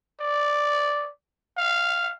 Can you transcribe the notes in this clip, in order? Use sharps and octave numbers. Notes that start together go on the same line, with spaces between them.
D5
F5